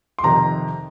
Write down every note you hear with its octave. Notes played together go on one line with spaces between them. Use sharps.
C6
F2 C3 D#3 A#5